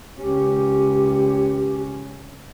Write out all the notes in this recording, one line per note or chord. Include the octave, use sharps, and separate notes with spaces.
C#2 C#4 G4